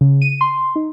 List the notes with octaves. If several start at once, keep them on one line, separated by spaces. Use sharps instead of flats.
C#3
D#7
C6
D#4